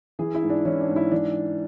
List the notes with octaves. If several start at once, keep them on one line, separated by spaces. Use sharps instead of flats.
E3 G#4
E4
G#2
D4
E3 C#4
D4
G#2
E4
E3 D4